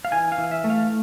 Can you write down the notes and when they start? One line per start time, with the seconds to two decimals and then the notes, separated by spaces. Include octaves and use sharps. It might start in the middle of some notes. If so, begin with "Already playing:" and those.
0.05 F5
0.12 E3 G#5
0.32 F5
0.38 E3
0.51 E5
0.64 A3
0.70 F5